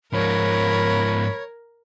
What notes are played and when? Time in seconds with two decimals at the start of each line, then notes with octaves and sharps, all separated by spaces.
0.14 G#2 F3 A#4 C#5 B5